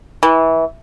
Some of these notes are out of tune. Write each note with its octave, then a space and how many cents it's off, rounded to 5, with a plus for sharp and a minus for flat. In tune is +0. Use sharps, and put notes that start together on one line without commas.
E3 -20